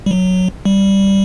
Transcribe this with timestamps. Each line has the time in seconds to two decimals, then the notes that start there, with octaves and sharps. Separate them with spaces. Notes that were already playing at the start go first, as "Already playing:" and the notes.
0.06 G3
0.11 F#3
0.65 G3